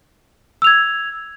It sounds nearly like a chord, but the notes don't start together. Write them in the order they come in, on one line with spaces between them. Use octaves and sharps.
E6 F7 G#6